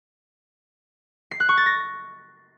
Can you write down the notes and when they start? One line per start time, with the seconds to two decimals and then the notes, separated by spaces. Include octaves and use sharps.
1.31 C7
1.40 F#6
1.49 C#6
1.57 A6
1.66 A#6